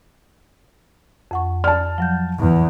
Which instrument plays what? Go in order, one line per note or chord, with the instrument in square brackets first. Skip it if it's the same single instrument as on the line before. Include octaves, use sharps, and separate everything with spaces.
[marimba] F2 F#5 C#6
[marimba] D5 [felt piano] A5 F6
[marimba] F3 F#3 G6
[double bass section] E2